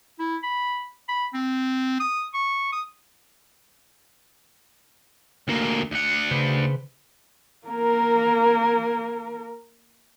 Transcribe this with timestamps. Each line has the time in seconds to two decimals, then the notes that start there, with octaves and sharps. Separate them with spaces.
0.19 E4
0.43 B5
1.09 B5
1.34 C4
2.00 D#6
2.34 C#6
2.73 D#6
5.48 D2 A#3
5.91 D2 F#5
6.31 C#3 B4 C5
7.67 A#3 A#4